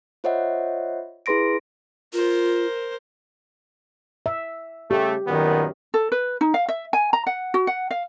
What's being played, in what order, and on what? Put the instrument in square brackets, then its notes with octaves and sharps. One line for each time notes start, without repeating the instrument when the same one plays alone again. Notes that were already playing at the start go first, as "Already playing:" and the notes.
[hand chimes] F4 C5 C#5 D#5 E5 F#5
E4 G#4 B4 C6 A#6 D7
[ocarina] F4 [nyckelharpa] A#4 C5
[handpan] E5
[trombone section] C#3 A3 [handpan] G4
[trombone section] F#2 A#2 B3 [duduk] D#3
[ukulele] A4
B4
D#4
F5
E5
G#5
A#5
F#5
F#4
F#5
F5